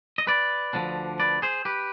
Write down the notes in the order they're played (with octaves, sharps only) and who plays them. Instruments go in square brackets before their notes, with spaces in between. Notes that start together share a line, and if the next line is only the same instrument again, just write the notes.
[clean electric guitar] D#5
B4 D5
D2 D3 F3 B3 D4
B4 D5
G#4 C5
G4 B4